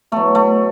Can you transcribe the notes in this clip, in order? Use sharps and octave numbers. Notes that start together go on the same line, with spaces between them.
B2 F#3 A3
A3